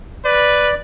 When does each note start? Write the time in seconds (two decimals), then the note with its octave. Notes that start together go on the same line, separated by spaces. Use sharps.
0.25 B4 D5